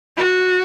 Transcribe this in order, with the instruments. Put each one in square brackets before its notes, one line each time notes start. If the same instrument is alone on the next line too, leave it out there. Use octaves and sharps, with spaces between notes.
[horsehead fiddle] F#4